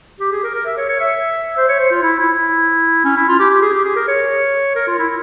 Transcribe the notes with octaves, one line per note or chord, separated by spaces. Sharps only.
G4
G#4
A#4
A#4
E5
C#5
C#5
E5
C5
C#5
C5
F4
E4
E4
C#4
E4
F4
G4
G4
G#4
G4
G#4
A#4
C#5
A#4
F4
E4